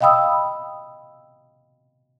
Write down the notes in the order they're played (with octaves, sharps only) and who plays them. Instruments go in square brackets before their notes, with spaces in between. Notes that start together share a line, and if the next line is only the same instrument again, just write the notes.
[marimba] D#5 F5 G5 B5 D#6 E6